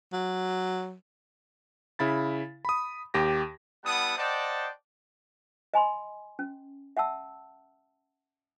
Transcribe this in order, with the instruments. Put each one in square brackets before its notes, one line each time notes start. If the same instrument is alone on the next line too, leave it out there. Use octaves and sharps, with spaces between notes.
[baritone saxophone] F#3
[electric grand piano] C#3 E4 B5 A6
B5 D#6
D#2 G4 A#6
[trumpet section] G3 B3 E4 F#5 A5 D#6
C5 D5 D#5 F#5 G5 A5
[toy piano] D#5 G#5 B5 C6
C#4
E5 F#5 A5 E6